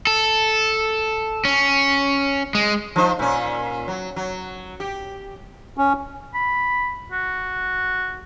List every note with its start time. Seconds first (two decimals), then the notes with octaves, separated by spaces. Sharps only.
0.07 A4
1.45 C#4
2.55 G#3
2.96 F3 D#4 C5
3.19 A#2 C#4
3.88 F#3
4.16 F#3
4.80 G4
5.78 C#4
6.34 B5
7.12 F#4